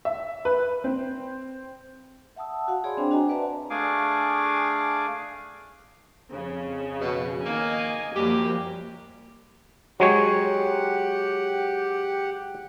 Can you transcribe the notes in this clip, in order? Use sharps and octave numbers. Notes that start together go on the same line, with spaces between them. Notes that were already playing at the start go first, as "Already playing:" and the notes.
E5
B4
C4
E5 F#5 A5 D#6 E6
F#4 F5 F#5
G#4 C#5 D5 G#5 B5 C6
C4 D4 C5 G5
D4 F#4 D#5 F#5 G#5 A#5
B4 D5 E5 F#5 A5 A#5
A3 D4 G#4 F5 G#5 D6
F2 C#3
B2
D#3 A#3 D#5 G#5
F#2 F3 G3 A#3 G4
F#3 G#3 G4 C#5 F#5